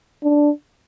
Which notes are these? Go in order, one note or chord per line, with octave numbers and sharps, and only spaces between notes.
D4